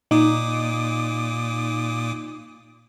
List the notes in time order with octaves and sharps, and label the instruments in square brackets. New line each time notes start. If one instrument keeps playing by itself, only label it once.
[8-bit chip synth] A#2 D6 D#6 [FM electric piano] D#4